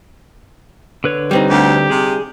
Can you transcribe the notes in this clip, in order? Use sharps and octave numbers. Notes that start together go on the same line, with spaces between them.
D3 B4 C#5
G3 C4 D#4
D2 G4
C3 G#4